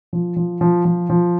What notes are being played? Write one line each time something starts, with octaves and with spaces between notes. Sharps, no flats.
F3
F3
F3
F3
F3